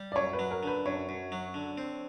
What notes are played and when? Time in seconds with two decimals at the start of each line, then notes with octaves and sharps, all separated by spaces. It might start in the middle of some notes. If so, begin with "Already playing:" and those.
Already playing: G3
0.12 D5
0.16 F#2 C#5
0.33 B4
0.39 F#3
0.51 A#4
0.63 D3 B4
0.86 F#2 C#5
1.09 F#2
1.32 F#3
1.54 D3
1.78 C4